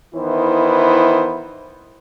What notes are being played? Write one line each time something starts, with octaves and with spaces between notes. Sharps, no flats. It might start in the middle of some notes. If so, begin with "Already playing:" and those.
D#3 E3 B3 E4 C5